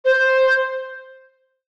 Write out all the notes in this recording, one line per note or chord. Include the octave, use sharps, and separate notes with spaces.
C5